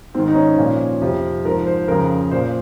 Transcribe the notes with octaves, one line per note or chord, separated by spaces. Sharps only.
G#2 D#3 C4
D#4
C#4
A#2 F3
F2 C3 F3
G#2 F3 A#4
C5
F2 C#3 F3 A#4
A#2 F3 C5